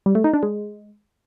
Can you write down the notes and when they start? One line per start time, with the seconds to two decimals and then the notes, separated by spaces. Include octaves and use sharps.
0.06 G3
0.15 A3
0.24 D#4
0.34 D4
0.43 G#3